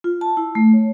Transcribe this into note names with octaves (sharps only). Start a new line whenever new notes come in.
F4
A5
E4
A3
C#5